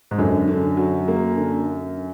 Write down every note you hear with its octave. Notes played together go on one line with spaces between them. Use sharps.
G#2
F#2 D3
D3
F#3
A#3
D3